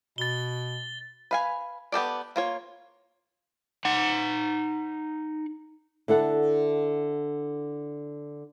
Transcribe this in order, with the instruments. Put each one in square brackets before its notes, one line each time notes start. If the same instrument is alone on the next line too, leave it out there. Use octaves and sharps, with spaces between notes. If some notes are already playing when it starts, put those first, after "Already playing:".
[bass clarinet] B2 [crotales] A6 G7
[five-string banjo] B4 F5 G#5
B3 G4 A4 D5
A#3 F4 C#5
[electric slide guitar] D#4 F#5
[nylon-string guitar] D3 E4 A4 F#5